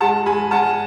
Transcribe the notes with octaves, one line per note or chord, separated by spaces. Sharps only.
G#3 F#5 A5
G#3 G#5 B5
G#3 F#5 A5